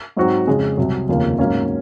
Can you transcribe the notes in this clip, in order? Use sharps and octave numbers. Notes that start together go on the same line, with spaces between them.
G#2 F#3 C4 D#4 F#4
F2 C#3 G#3
C2 C3 F#3
F1 D#2 C#3 F3 A#3
G#2 F#3 A#3 C#4